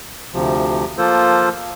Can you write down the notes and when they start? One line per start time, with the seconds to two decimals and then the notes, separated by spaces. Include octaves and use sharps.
0.33 D2 C3 F3
0.97 F3 A#3 F4 A4 C5